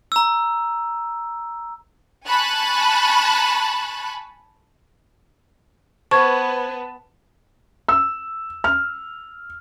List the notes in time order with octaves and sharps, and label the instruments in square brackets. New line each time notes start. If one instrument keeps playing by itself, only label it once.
[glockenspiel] A#5 E6
[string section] G#5 A5 B5 C#6 F#6
[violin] B3 B4 [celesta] C5 G#6 [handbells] A5 [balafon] C#6
[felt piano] E6
F6